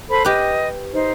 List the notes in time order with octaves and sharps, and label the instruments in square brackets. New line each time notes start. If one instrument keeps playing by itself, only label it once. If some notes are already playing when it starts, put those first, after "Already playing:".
[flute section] A4 C5 B5
[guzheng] G4 B4 [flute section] D#5
[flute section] D#4 C5